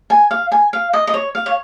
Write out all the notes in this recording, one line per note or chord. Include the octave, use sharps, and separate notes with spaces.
G#5
F5
G#5
F5
D#5
D#5
C#5
F5
C#5